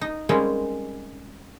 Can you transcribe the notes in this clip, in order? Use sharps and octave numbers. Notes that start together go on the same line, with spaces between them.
D#4
G3 G#3 A#3 C4 C#4